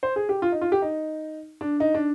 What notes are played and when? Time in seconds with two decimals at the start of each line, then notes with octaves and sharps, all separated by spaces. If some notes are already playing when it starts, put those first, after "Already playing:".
0.03 C5
0.16 G#4
0.29 G4
0.42 F4
0.52 D#4
0.61 F4
0.72 G4
0.82 D#4
1.61 D4
1.80 D#4
1.94 D4